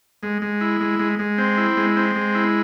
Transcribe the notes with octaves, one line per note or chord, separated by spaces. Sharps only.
G#3
G#3
E4
G#3
G#3
G#3
C4
E4
G#3
C4
G#3
E4